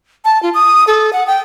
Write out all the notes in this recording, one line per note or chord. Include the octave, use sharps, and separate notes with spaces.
A5
F4
D#6
A4
F#5
G5